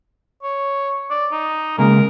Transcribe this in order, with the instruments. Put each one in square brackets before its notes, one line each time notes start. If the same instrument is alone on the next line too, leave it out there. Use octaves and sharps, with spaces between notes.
[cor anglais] C#5
D5
D#4
[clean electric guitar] C#3 G#3 A#3 [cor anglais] A#4